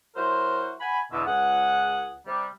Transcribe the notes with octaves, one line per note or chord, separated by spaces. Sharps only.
F#3 E4 F#4 A#4 C5
F#5 G#5 B5
E2 B2 D3 E5
C#2 G#4 F#5
C3 G3